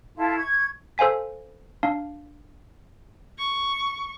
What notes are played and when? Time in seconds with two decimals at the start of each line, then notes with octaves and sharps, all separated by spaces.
0.16 E4 F4 A4
0.37 C#6 G#6
0.98 A4 C5 F5 G#5 B6
1.83 D4 F5
3.38 C#6